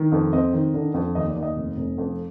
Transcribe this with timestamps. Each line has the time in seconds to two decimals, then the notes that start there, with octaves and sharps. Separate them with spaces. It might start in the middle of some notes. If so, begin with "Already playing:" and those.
Already playing: D#3
0.12 F2
0.33 C4 D#5
0.53 D#3
0.74 D3
0.94 F2
1.15 D#2 D#5
1.29 D5
1.36 D#2
1.43 D#5
1.56 F1
1.77 F1
1.98 F2